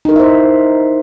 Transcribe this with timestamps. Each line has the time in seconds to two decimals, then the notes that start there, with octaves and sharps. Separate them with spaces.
0.05 D#4
0.09 A#4
0.12 E4
0.16 E5
0.20 C5